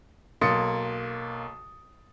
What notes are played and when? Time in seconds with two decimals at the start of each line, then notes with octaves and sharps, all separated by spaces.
0.41 B1 A#3 C6 D#6 A6 C#7